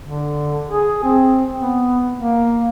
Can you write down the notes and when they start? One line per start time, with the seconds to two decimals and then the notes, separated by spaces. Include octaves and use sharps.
0.02 D3
0.69 G#4
1.04 C4
1.57 B3
2.17 A#3